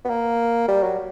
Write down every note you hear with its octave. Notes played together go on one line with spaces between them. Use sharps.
B3
A#3
G3
F#3